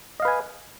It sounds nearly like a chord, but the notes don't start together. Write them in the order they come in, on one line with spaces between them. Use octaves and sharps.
D#5 F5 B4 G#5